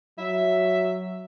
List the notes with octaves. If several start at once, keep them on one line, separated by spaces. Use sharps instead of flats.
F#3 E5